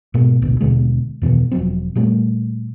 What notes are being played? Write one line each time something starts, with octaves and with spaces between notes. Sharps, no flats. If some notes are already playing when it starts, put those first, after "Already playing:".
G#2 B2 G#3 A#3
G#1 D2 B2
D#2 B2 D3 G#3
E2 B2 D#3 E3
E1 F3 F#3 C4
A#2 G3 A3 A#3